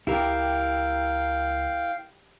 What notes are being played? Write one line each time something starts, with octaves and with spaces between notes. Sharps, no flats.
C#2 E4 G4 A#4 F5 G5